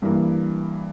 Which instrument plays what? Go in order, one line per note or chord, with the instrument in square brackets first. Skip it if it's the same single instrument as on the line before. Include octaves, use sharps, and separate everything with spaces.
[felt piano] G2 E3 A#3